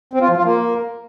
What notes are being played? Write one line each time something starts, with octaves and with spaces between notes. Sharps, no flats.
C4
F4
F3
F4
A#3